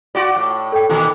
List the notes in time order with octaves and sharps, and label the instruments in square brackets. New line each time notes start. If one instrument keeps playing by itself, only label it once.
[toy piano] F4 F5 C6 [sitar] F#4 D5
[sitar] A2
[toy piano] A4 C#5 G5
[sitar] A#2 D#3 E3 [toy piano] E4 F4 G4